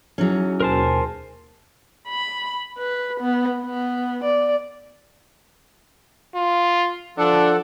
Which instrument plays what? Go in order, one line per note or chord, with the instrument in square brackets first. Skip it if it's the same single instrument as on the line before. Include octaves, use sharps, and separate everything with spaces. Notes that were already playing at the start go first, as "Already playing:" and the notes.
[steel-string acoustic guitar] F#3 C#4 [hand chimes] D#4 E4 G#4
[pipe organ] D#2 B2 G#5 [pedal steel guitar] A#4 C5 A5
[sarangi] B5
B4
B3
B3
D5
[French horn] F4
[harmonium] F3 A4 F#5 [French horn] D4